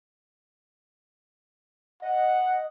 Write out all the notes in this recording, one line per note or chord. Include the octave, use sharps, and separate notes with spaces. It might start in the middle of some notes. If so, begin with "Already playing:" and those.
D#5 F#5